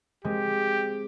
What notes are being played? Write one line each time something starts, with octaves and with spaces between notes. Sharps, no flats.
G#3 C4 G4